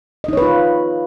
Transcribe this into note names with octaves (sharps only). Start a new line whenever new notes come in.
D#4 F4 B4 C#5 D#5